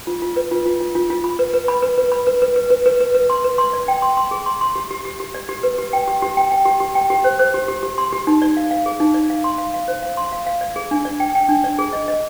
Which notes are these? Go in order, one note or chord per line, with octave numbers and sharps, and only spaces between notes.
F4
F4
B4
F4
F4
F4
F4
F4
B5
B4
B4
B5
B4
B4
B5
B4
B4
B4
B4
B4
B4
B4
C6
B4
C6
D5
G5
C6
C6
G#4
C6
C6
G4
G4
G4
G4
D5
G4
B4
G4
G5
G4
G4
G5
G5
G4
G4
G5
G4
C5
C5
G4
G4
G4
C6
G4
D#4
D5
F5
F5
G#4
D#4
D5
F5
C6
F5
F5
C5
F5
C6
F5
F5
D5
G#4
D4
D5
G5
G5
D4
D5
G#4
D#5
D#5